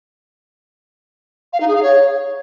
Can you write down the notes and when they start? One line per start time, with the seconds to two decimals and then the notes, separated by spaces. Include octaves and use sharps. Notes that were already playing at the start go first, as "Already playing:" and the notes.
1.53 F5
1.60 D#4
1.68 G#4
1.75 F5
1.83 C#5